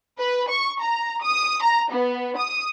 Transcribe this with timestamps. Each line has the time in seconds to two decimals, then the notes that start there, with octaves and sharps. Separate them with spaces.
0.20 B4
0.50 C#6
0.82 A#5
1.24 D#6
1.63 A#5
1.92 B3
2.39 D#6